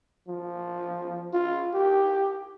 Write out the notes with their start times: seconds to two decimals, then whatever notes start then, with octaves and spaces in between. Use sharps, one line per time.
0.28 F3
1.33 F4
1.74 G4